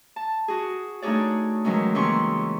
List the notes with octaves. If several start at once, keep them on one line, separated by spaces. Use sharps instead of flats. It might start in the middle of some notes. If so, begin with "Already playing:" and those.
A5
F#4 G#4
A3 D4 D#4 G#4 C#5 D5
D#3 E3 F#3 G#3 C#4
D#2 C#3 E3 C#4 C6 C#6